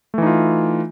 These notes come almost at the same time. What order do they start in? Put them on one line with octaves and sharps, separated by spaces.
A3 E3 D#4 F4